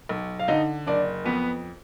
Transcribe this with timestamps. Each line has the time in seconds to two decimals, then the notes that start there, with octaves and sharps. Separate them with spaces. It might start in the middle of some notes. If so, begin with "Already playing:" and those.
0.09 B1
0.39 F5
0.48 D3 D#4 D#5
0.87 F#1 D4 D5
1.25 F2 B3 B4